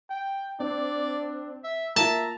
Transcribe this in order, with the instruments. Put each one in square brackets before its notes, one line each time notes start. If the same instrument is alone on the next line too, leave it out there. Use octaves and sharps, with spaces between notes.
[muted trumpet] G5
[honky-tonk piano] C4 [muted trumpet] D4 [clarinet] D5
[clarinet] E5
[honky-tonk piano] A#3 F4 [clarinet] E5 [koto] A5 [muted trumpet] A#5